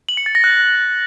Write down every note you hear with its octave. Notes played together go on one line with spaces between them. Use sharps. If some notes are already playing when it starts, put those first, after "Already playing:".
F#7
C#7
A6
A#6
F#6